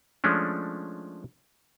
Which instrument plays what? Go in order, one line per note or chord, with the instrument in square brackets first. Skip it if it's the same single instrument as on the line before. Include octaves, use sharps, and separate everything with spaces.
[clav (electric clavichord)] F3 G#3 A3 C#4 D4